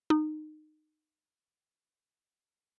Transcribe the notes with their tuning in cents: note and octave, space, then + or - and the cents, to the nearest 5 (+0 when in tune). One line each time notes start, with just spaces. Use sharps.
D#4 -20